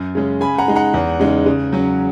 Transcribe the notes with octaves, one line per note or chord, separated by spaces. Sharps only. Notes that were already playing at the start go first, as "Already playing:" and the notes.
Already playing: F#2
C#3 G#3 C#4
C#3 G#5 B5
F#5 A#5
G#3 D#4
F#5 A#5
E2
C#3 G#3 D#4
C#3
F#3 C#4